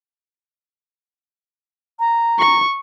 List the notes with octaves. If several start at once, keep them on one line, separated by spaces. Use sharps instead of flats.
A#5
C#6